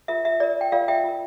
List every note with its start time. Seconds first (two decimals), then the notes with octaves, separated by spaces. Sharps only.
0.08 F4 A#4 E5
0.25 E5
0.40 F4 A#4 D5
0.61 G5
0.72 F4 A#4 D5 F5
0.88 E5 G5
1.04 F4 A#4